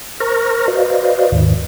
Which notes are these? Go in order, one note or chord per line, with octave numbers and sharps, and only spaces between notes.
A#4 C5 A#5 C#6 F6 A#6
F#4 B4 C5 D5 D#5 F5
D#2 G#2 D#3